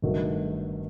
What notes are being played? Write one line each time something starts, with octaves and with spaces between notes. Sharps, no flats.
G1 G2 D#3 F#3 A3